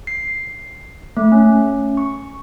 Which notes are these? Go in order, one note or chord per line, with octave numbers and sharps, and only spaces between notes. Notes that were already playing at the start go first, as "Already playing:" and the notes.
C7
A3
C#4
C#6